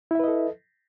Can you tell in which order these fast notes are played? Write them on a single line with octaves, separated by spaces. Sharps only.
E4 E5 B4 D#5 A4